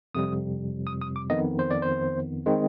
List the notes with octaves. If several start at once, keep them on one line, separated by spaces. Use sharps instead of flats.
F2 C3 G3 D#6
D#6
D#6
D6
F2 D#3 B3 D#5
C5
D5
C5
D#3 G#3 C4